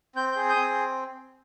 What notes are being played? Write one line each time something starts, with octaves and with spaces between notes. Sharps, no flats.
C4 G6
G6
G#4
D#6 G6
C4